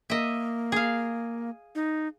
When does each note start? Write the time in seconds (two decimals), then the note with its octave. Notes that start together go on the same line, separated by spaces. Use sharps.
0.10 A#3 D#5 E5
0.72 G#4 F5
1.75 D#4